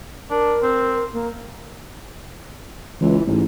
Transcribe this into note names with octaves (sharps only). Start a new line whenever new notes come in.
D4 A#4
C4
A#3
C#2 E3
A1 G#2